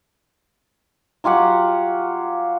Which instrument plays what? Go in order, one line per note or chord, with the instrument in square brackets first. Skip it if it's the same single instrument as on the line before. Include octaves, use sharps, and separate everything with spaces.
[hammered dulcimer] F#3 F4 G4 F#5